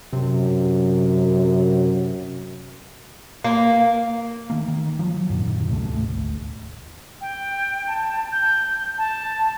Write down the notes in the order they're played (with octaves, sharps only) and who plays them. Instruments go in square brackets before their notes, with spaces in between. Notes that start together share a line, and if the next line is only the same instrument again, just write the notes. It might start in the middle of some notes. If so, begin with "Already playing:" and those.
[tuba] F#2 [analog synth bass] C3
[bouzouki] A#3
[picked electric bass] D#3 A3 A#3
D#3
F3 F#3
F#2 A#2 D3 D#3
C#2 A2 C3 A3
D#1 G#1 D2 A3
[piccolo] G5
A5
G6
A5